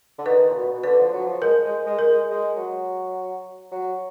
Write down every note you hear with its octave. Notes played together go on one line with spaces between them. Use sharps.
D3
D#3 B4
A#2
B2
B2
D3 B4
F3
F#3
F3
G#3 A#4
G#3
G#3
A#4
G#3
G#3
F#3
F#3